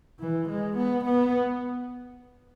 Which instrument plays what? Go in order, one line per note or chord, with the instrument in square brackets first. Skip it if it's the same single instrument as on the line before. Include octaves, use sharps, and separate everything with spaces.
[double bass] E3
G#3
B3
B3